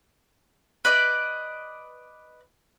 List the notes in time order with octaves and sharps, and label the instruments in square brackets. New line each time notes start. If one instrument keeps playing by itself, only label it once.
[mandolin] B4 D5 D#5